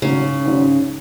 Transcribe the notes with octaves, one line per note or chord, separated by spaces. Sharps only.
G#1 G#2 C#3 F#3 C#4
G#1 G#2 F#3 C#4